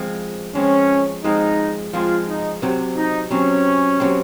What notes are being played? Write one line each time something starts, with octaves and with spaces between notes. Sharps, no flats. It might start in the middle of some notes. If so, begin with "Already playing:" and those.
Already playing: F3 G#3 C4
F3 G#3 C4 C#4
F3 G#3 C4 D#4
F3 G#3 C4 F4
D#4
C3 F#3 C4
D#4
C3 F#3 C4 C#4
C3 F#3 C4